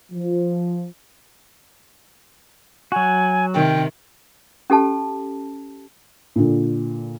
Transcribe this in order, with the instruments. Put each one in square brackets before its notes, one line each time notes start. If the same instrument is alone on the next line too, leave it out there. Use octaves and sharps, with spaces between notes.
[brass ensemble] F3
[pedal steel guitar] F#3 F#4 [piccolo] G#5
[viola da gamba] C3 D#3 [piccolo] G5
[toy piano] C#4 G4 A4 A5
[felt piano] A#2 D3